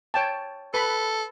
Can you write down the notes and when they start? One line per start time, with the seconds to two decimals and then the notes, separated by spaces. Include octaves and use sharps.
0.14 C#5 G5 A5
0.74 A4 B4 B5